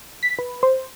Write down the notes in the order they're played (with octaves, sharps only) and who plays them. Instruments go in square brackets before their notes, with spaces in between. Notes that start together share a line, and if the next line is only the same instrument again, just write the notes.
[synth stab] B6
B4
C5